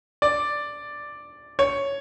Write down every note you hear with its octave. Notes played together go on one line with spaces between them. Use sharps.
D5
C#5